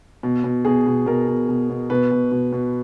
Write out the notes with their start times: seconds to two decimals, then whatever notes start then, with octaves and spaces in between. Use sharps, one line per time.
0.23 B2
0.44 B2
0.65 B2 G#4
0.87 B2
1.06 B2 A#4
1.28 B2
1.49 B2
1.70 B2
1.90 B2 B4
2.11 B2
2.32 B2
2.53 B2